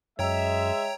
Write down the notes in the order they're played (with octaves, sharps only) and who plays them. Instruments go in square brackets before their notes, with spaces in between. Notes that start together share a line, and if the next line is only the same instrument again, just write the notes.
[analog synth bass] F#2 [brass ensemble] G#3 E5 [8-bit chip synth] C#5 G5 A#5